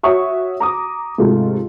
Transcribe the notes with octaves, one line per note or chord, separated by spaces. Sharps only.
F#4 C#5 E5 C#6 D#6
A#5 D6 D#6
G#2 C3 A3 F4